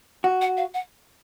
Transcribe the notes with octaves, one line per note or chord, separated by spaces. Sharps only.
F#4
F#5
F5
F#5